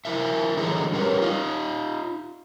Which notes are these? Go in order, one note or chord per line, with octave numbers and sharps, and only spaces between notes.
F3 E4 A#4 E5
D3 E3 F#3 D#4 G#4 A4
G3 C#4 G4 A#4 B4 C#5
D#4 F4